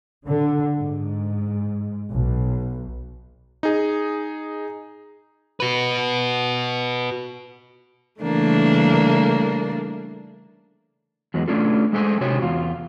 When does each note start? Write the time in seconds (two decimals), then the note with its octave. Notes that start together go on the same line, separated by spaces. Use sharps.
0.27 D3
0.76 G#2
2.13 B1
3.63 D#4 G#4
5.60 F#4 B4
8.21 C#3 E3 G3 A3 A#3 D4
11.34 E2 F#3 G#3
11.48 A3 C#4 D4 F4 A4
11.93 G#3 A4 C5 G#5
12.21 C3 F#4 G4 C#5
12.42 E2 F4